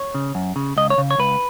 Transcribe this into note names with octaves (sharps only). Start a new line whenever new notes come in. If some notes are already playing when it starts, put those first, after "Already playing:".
Already playing: C#5
C#3
F#2
C#3
C#2 D#5
C#5
C#3
C#5
C#2 B4